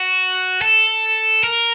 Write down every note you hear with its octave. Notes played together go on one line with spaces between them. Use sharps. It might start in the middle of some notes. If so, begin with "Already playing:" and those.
Already playing: F#4
A4
A#4